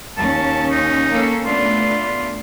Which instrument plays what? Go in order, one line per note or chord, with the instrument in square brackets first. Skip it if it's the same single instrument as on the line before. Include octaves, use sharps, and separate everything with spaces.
[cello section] D#2 C#4 [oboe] A5
[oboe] D#4
[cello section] A#3 C#4 A4
[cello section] A3 B3 D4 [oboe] F4